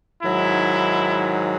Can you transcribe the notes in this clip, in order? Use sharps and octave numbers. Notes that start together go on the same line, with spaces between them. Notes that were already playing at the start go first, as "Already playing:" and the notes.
G#2 D#3 F#3 E4